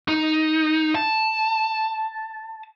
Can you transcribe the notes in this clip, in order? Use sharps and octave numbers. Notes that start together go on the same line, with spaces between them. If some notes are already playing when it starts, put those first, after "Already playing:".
D#4
A5